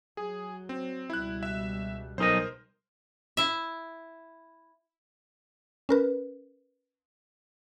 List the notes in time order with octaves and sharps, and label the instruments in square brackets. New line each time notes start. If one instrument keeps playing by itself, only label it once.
[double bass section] F#3 [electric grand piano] G#4
[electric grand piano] C4
[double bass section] C#2 B2 G3 [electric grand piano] E4 F#6
[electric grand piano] E5
[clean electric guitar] B1 D#4 D#5 [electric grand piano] A#4 C5
[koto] E4 E5
[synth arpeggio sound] C#4 A#4 B4